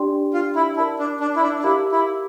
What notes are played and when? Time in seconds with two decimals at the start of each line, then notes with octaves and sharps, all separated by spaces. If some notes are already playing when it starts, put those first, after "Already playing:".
Already playing: D4 G4 D5 G5 C6
0.34 F4
0.56 E4
0.76 E4 A#4 D5 A5
0.99 D4
1.20 D4
1.36 E4
1.42 D4
1.59 D4
1.64 E4 G4 A#4 F5 A#5 D6
1.92 E4